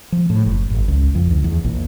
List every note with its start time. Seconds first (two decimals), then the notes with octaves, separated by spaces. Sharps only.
0.12 F3
0.30 A2
0.46 F#1
0.70 G#1
0.88 C#2
1.15 F2
1.31 D2
1.44 E2
1.64 A#1